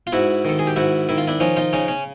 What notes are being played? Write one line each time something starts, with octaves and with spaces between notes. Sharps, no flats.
F4
G#2 E4 F#4
D#3 A4
G#4
G4
G#2 E4 F#4
D#3 E4
F4
D4 E4
F3 C#4 D#4
D#4 F4
C#3 C#4 D#4
C#4